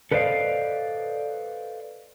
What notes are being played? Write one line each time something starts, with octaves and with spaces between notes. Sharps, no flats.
A4 B4 C5 D5 D#5 F5